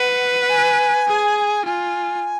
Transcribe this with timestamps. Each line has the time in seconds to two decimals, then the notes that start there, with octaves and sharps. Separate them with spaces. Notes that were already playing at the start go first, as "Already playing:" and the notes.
Already playing: B4 F#5
0.41 F#5
0.49 G#5
1.08 G#4
1.65 F4 G#5